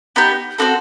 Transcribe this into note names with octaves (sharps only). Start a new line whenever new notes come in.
B3 D#4 G4
C4 D#4 F#4 A4